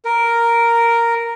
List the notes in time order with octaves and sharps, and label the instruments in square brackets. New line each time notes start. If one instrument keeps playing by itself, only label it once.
[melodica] A#4